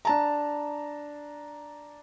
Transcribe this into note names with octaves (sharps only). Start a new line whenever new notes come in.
D4 A5 A#5